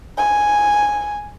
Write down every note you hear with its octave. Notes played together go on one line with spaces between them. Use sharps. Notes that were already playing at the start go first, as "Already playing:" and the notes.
G#5